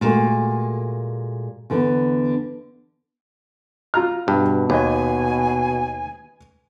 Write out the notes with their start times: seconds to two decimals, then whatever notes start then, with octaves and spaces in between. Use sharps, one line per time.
0.01 A#2 G#3 A3 F#4
1.70 E2 D3 B3
3.94 F4 A#5 F6
4.28 G2 B2
4.70 D#2 B4 D#5 G#5